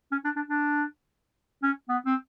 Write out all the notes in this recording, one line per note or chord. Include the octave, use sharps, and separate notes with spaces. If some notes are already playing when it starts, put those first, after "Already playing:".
C#4
D4
D4
D4
C#4
B3
C4